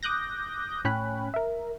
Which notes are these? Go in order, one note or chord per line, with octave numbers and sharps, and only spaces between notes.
D6 D#6 F#6 G6 A#6
A2 C#4 G5 B5 F#6
A#4 E5